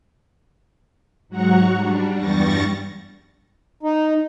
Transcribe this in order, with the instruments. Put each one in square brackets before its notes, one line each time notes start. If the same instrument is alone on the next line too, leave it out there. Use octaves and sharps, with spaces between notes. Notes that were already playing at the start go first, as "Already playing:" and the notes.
[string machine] G#2 F#3 F#4 F#5 A#5 C#6
G3 D4
E2 G2 G3 C#6 A6 A#6
[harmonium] D#4